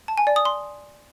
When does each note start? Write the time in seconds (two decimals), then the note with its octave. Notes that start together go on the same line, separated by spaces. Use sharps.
0.08 A5
0.18 G#5
0.27 D5
0.36 D#6
0.45 C6